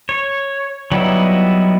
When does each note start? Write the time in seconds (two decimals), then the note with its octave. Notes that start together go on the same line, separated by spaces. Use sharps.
0.09 C#5
0.92 F#3 G3 B3 D#4 E4